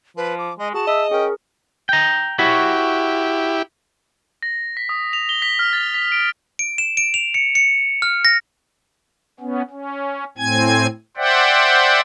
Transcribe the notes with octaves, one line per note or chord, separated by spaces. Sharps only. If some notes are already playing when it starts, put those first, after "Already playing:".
F3 B4
D6
G#3 D#5
F#4 G#4 A5
D#5 E5
C#4 G#4 A#4 G5
G5 A#5
E4 F#4 G4 C#5 B5
A#6
B6
D#6
F7
G7
B6
F6
A6
B6
D7
D7
E7
D7
F7
C#7
C#7
F6
A#6
B3 C#4
C#4
A2 C4 G#5 G#6
C5 D5 E5 F#5 G5